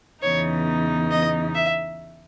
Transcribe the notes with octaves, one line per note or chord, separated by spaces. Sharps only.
E2 C#3 E3 B3 D#4 C#5
D#5
E5